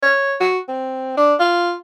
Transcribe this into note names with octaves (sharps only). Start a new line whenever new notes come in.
C#5
F#4
C4
D4
F4